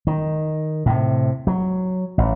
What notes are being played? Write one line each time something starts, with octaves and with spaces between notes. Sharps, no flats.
D#3
A2 C3
F#3
A1